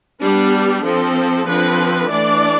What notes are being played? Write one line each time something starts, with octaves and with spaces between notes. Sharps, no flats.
G3 B3 D4 G4
F3 C4 A4
D3 F3 C4 B4
E3 A3 D4 D5